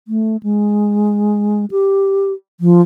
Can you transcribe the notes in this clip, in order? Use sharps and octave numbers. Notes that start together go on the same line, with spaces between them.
A3
G#3
G4
F3